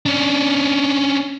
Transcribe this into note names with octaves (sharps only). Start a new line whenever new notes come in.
C#4 D4